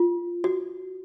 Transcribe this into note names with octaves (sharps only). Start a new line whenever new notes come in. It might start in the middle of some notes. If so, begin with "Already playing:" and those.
Already playing: F4
F#4